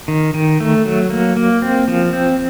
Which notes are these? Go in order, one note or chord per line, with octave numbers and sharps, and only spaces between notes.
D#3
D#3
A3
F#3
A#3
A#3
C4
F3
C4